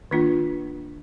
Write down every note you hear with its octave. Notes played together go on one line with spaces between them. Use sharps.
D#3 A#3 D4 F4